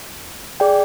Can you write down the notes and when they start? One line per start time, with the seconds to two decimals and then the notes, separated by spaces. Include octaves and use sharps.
0.60 G#4 D5 G5